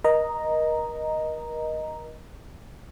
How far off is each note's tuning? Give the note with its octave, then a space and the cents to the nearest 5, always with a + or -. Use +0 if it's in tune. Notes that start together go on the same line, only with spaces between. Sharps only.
A#4 +35 D#5 +0 A#5 +0